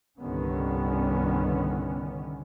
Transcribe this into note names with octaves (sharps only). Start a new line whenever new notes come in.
C2 G2 D3 D#3 B3 C#4